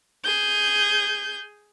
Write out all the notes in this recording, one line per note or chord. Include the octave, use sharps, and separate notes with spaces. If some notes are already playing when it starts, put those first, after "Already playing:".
G#4 G6